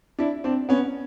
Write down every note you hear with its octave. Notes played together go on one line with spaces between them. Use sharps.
D4 E4
C4 D4
B3 C#4